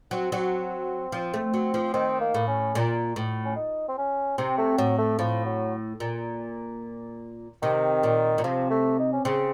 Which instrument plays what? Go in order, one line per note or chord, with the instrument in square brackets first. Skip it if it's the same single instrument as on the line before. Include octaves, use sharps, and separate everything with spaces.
[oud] F#3 [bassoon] C4
[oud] F#3
F3
A3
F#3
F3
[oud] D#3 [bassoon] C4
[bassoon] A#3
[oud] A2
[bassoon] C#4
[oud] A#2
A2
[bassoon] C#4
D#4
C4
C#4
[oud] C3 [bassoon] C4
[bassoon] A3
[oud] A2 [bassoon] F#3
[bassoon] A3
[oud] A2 [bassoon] F3
[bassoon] F#3
[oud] A#2
[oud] C3 [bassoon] D#3
[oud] A#2
A#2
[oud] C3 [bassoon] F3
[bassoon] A3
D#4
C#4
[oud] C#3 [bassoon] C4